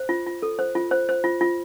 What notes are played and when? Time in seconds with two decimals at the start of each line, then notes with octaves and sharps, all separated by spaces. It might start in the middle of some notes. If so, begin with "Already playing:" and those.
Already playing: C5
0.09 F4
0.27 F4
0.42 A4
0.59 C5
0.75 F4
0.91 C5
1.09 C5
1.24 F4
1.41 F4